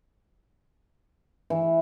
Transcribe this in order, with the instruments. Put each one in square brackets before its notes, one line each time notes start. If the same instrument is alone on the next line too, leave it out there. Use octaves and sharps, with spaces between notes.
[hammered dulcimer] E3